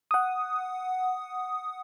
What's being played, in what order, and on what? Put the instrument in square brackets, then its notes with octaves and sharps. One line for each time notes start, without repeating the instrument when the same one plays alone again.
[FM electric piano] F#5 D#6